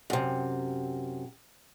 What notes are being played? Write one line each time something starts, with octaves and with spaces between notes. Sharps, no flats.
F#2 C3